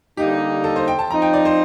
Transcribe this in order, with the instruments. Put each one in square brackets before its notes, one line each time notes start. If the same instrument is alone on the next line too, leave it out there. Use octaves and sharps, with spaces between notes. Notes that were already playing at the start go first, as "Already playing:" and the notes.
[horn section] D3 G3 A#3 D#4 [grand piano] G4
[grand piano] A4
C5
G5
A5
[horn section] F3 C4 D#4 [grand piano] A#5
[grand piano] G5
D5
C5